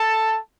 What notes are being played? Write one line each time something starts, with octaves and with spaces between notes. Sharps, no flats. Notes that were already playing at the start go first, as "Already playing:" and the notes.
Already playing: A4 A5